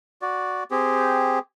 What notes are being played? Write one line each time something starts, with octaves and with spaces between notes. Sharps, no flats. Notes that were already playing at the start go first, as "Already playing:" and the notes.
F#4 D5
C4 G4 G#4